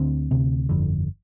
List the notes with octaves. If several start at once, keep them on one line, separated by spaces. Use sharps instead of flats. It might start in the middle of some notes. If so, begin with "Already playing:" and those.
Already playing: D2 D3 C4
D2 C3
G1 F2 D3